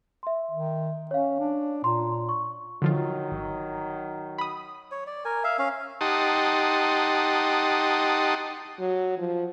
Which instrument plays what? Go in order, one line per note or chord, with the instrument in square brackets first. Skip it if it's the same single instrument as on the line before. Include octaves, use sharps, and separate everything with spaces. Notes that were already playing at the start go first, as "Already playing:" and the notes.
[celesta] E5 C6
[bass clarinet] D#3
[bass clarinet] C#4 [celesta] C#5 F5
[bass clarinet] D4
[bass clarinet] A#2 [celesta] A#5 C6
[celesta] C#6
[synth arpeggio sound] D3 F3 F4 [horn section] D#3 F#3
[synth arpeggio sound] G#1
B5 D#6
[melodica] C#5
D5
A#4 G#5
E5 F5
C#4 F5
[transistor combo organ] D#4 G4 F#5 A5 C6 D#6
[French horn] F#3
F3